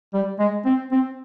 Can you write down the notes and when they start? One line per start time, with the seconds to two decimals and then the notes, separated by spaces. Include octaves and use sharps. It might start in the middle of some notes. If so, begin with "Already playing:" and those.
0.14 G3
0.39 G#3
0.66 C4
0.92 C4